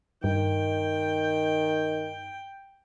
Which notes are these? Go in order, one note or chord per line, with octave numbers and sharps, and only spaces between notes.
G2 D#3 G5